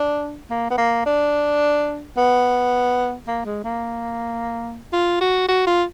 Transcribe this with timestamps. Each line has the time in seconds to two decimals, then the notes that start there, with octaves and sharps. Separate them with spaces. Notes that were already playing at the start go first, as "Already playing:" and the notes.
Already playing: D4
0.50 A#3
0.70 B3
0.78 A#3
1.06 D4
2.17 B3
3.27 A#3
3.45 G#3
3.64 A#3
4.93 F4
5.21 F#4
5.48 F#4
5.67 F4